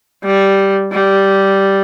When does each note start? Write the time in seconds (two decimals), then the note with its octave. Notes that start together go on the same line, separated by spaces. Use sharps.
0.24 G3
0.93 G3